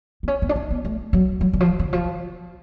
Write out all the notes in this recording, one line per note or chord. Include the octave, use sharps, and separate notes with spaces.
B3
C#4
B3
D4
C#4
B3
A3
F#3
F#3
D3
F3
D3
F3